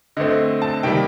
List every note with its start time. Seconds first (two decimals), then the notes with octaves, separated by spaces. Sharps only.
0.17 D3 A3 C4 D#5
0.62 A5
0.83 C3 D#3 G3 A#3 G5